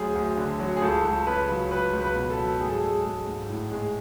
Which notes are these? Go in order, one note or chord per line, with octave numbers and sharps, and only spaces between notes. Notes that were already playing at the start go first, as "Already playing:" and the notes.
Already playing: D2 F#3 G#4
D2
D3
F#3
G#4
C#2 A4
C#2
C#3 B4
F#3
C#2 B4
C#2
B4
B2
A4
F#3
G#2 G#4
A4
G#4
G#3
G#3
G#2
A2
G#3